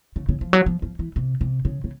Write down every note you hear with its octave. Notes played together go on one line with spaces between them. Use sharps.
C#3
C#3
F3
F#3
F3
F3
E3
C3
C3
C#3
C#3